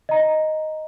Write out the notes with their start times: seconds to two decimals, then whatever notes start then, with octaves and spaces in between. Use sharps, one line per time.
0.09 D#5 A#5